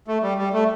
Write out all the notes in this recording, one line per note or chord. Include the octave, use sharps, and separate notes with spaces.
A3
G3
G3
A3